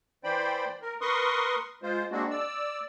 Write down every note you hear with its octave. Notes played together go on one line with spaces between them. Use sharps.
E3 C5 D5 G5 B5
A#4
A#4 B4 C6 C#6 D#6
G#3 F4 C5
G#3 A#3 C4 D4 F#4
D5 E6